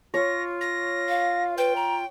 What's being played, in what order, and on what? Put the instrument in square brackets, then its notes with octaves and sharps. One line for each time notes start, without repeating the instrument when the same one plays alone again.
[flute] F4 [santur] C#5 [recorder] A#6
[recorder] A#6
[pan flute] F5
[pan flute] B4 [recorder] G5
[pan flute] A#5